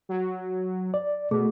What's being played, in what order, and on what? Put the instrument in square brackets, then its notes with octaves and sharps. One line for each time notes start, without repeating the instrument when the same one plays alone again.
[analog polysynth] F#3
[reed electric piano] D5
[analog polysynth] B2 [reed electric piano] A3 [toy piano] G#4